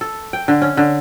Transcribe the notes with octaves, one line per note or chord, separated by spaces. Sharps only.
A4
G5
D3
C#4
D3